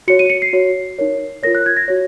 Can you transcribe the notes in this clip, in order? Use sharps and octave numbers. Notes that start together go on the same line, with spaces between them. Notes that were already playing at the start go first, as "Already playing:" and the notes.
F#4 C#5 C#7
D#7
C#7
C7
F#4 C#5
D#4 A#4 C#5
F4 A#4 C#5 A#6
F#6
G#6
A#6
F#4 C#5